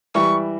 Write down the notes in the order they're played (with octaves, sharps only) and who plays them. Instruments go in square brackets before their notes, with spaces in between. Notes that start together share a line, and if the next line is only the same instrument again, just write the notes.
[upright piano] E3 G3 [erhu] C#6